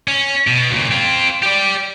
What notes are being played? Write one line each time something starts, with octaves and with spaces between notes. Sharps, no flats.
C#4
B2
C#2 A#2
C4 F4
G4 D5